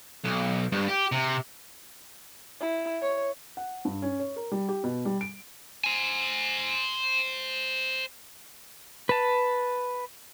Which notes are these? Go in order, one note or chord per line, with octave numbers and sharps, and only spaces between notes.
B1
G2
G4
C3
E4
C#5
F#5
G2
C#4
C#5
A#4
G3
G4
B2
G3
D7
C5 G#5
B4 A5